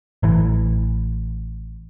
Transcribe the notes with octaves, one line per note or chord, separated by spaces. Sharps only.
A1 E3